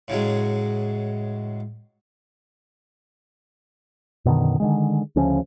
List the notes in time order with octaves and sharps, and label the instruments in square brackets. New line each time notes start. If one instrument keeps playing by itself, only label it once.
[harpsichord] A2 C#3 F#3 G#3
[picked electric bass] F#2 B2 D3 D#3
D3 D#3 G#3
D2 C#3 F3 C#4